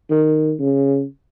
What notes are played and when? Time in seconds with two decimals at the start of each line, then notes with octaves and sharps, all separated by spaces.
0.10 D#3
0.60 C#3